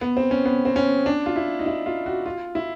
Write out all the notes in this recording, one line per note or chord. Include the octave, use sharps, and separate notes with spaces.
B3
C4
C#4
B3
C4
C#4
D4
F4
E4
D#4
E4
F4
F#4
F4
E4